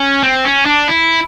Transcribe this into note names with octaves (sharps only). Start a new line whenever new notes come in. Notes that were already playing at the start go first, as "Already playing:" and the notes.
Already playing: C#4
C4
C#4
D4
E4